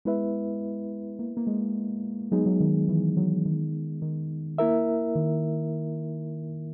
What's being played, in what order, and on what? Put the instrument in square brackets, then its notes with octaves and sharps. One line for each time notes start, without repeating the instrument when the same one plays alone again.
[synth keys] G#3 [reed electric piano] B3 E4 B4 E5
[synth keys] A#3
A#3
G#3
[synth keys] F#3 [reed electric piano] G#3 B3 D#4 G#4
[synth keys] F#3
D#3
E3
F#3
D#3
D#3
[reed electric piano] A#3 E4 A#4 E5
[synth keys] D#3